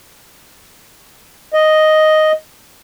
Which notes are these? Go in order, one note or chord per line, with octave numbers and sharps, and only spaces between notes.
D#5